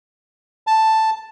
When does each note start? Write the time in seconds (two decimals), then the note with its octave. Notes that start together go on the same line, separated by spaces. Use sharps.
0.67 A5